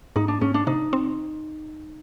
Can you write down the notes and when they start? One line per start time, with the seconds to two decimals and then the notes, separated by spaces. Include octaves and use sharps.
0.16 G#2 D#4
0.28 D4
0.41 G#2 C#4
0.54 D4
0.67 C3 D#4
0.93 C4